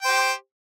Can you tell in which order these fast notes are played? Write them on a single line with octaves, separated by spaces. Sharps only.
G5 C5 G4